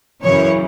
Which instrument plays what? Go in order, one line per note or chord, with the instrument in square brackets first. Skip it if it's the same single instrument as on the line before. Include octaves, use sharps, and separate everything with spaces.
[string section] F#2 C#3 E3 C#5